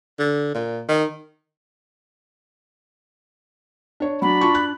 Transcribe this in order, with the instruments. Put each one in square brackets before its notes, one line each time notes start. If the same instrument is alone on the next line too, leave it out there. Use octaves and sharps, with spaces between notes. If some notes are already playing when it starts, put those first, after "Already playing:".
[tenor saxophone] D3
A#2
D#3
[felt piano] D4 C#5
[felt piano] F#3 [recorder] D4 [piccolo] B5
[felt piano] F4 A5 C#6
F#6